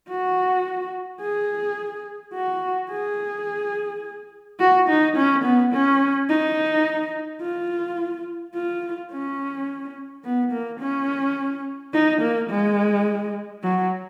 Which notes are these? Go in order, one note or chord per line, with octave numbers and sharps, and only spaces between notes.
F#4
G#4
F#4
G#4
F#4
D#4
C#4
B3
C#4
D#4
F4
F4
C#4
B3
A#3
C#4
D#4
A#3
G#3
F#3